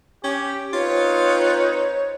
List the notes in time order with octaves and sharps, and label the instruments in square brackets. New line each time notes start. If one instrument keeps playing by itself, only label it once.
[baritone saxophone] C#4 [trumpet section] G4
[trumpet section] C4 D#4 B4 [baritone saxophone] F4 [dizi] C#5